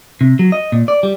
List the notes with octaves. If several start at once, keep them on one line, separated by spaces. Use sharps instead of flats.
C3
F#3
D#5
A#2
D5
G3